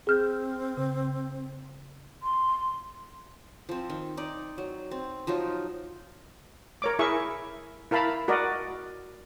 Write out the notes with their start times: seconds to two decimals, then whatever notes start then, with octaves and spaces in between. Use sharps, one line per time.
0.07 C4 G#4 F6 G6
0.77 C#3
2.23 C6
3.69 F3 C4
3.90 D#3
4.17 D#4 D5
4.58 F#3
4.91 C4
5.27 F3 F#3 D#4 F4
6.82 A#4 C#5 D6
6.99 E4 G#4 A#4 E5 C#6
7.91 E4 A#4 F5 A5 B5
8.28 F#4 A#4 D5 D#5